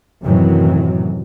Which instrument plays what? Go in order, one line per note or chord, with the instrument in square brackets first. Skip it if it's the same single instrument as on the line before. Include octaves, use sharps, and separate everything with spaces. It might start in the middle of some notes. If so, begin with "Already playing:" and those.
[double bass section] F#2 A2 C3 D#3 E3 F#3